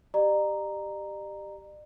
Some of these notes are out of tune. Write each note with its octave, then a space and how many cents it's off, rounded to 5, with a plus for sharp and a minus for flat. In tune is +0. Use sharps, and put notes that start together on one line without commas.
G4 +0 D5 +45 A#5 +0